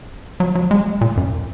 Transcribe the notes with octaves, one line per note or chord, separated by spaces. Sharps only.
F#3
F#3
G#3
A#2
F#2